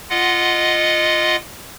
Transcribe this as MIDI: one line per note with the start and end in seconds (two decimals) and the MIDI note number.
0.10 1.36 65
0.10 1.36 75
0.10 1.36 78